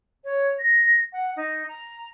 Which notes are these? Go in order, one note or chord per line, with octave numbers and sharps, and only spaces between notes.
C#5
A#6
F#5
D#4
A#5